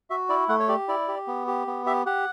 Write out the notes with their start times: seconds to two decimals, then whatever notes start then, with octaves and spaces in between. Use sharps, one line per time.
0.10 F#4 E5
0.29 E4 D5
0.49 A3 F#5
0.60 C#5
0.68 G4 D5
0.88 E4 D5
1.08 G4
1.28 B3
1.47 G4
1.67 B3
1.86 G4 E5
2.06 G4 F#5